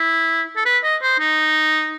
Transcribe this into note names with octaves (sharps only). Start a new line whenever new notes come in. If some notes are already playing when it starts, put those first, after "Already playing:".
Already playing: E4
A4
B4
D#5
C5
D#4